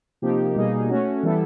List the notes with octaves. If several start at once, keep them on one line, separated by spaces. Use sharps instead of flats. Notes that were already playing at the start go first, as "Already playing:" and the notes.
C3 F3 A#3 D#4 G4
B2 G3 A#3 D#4 G#4
A3 C#4 F#4
E3 G3 B3 E4 A4